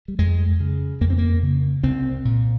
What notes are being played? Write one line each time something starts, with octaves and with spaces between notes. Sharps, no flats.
G3
F2 G#3
C#3
F2 A#3
C4
A#3
C#3
C2 C4
A#2